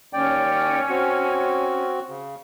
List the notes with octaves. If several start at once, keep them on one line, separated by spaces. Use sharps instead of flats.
D#2 C#4 D5 G5
C4 F#4
C#3